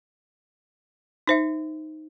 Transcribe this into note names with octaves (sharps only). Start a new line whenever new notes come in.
D#4 C5 E5